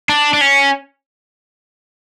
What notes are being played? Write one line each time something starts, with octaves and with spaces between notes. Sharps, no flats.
D4
D4
C#4